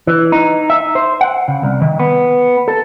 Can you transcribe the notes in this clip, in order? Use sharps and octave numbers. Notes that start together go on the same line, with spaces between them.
E3
D#4
E5
C5
F#5
C#3
C2
D#3
B3
A4